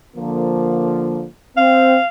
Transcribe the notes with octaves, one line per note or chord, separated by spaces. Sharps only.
D3 F3 A#3
C4 F5